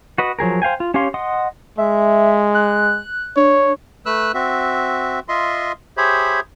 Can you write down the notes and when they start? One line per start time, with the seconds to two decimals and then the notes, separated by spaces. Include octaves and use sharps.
0.18 F#4 B4 D#5
0.39 F3 F#3 G#4 A#4
0.62 C5 F5 G5 G#5
0.80 F4
0.94 C#4 G4 C#5 F5 C6
1.14 D#5 F#5 C6 D#6
1.78 G#3 E5
2.54 F#6
3.36 D4 C#5
4.06 A3 B4 E6 F#6
4.34 C4 F#4 E5
5.29 F4 D#5 E5 C6
5.97 G4 G#4 C5 C#5 E5 B5